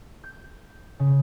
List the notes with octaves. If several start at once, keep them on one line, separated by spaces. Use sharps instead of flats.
G6
C#3